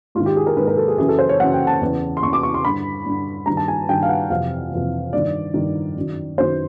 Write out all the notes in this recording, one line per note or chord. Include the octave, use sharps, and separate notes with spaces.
G#2 F4
D#3
G4
G#4
A#4
G#2 D#3 B4
A#4
A4
G#4
F#2 C#3 E3 G#4
A4
C5
C#5
F#2 C#3 E3 F#5
G5
A5
E2 C#3 E3
C6
E2 C#3 E3 C#6
D6
C#6
C6
G2 D3 B5
G2 D3
G2 D#3 A#5
A5
G#5
G2 D#3 G5
F5
F#5
F2 C3 E3 F5
F2 C3 E3
G2 D#3 D5
G2 D#3
F#2 D#3
F#2 D#3 C5